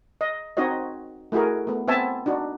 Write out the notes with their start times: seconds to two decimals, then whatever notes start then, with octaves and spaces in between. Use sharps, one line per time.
0.21 D#5
0.57 C4 D#4 F#4 C#5 D#5
1.32 A3 E4 F#4 G#4 A#4
1.67 A3 B3
1.88 B3 C4 E5 G#5 A5
2.26 D4 D#4 F#4